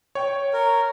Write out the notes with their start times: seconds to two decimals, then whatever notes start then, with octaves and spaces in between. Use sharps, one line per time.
0.15 C#5 G5
0.53 A#4